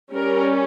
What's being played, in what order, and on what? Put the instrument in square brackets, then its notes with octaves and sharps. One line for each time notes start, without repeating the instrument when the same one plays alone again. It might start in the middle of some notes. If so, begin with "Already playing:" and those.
[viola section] G3 C#4 A#4